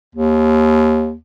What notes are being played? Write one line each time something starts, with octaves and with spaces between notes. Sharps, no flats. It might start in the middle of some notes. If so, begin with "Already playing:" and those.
D#2